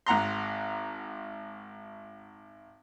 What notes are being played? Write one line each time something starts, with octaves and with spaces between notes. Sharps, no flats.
G#1 F#5 A#5 C6